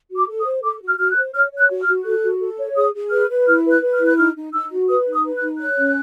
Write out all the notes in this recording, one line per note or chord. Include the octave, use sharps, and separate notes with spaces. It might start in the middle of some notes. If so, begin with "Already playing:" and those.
F#4
D6
A4
D#6
C5
A4 D6
F#4
F6
F#4 F6
F#6
C5
C#5 F6
C#5
F#6
F#4
F6
F#4
A4 F#6
F#4
A4
C#5
G#4 D#6
G#4
B4 F6
B4
E4 F6
B4
F#6
B4
F6
E4
F#6
D#4 F6
D#4
D#4 E6
F#4
B4 D#6
D#4
D#6
B4
F#6
D#4
C#5 F#6
C#4